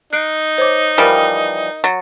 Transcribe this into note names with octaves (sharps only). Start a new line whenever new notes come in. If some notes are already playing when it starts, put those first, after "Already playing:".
D#4 F#6 C7 D7
C5 C#5 D6
E3 F3 G3 A#4 G5
F#3 A6